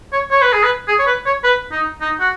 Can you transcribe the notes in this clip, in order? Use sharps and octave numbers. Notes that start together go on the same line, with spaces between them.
C#5
C#5
B4
G#4
B4
G#4
C#5
B4
C#5
B4
D#4
D#4
F#4